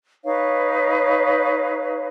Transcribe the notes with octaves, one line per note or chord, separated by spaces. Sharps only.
D#4 B4 C#5 F5